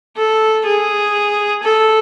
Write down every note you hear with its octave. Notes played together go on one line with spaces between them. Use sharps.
A4
G#4
A4